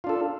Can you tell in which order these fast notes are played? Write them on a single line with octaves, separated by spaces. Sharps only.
F4 D4 A4